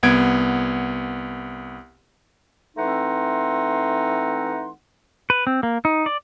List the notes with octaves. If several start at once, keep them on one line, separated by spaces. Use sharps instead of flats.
C2 B3 G#6 D7
E3 A3 C4 D#4 F#5 C6
B4
C4
A#3
D#4
D5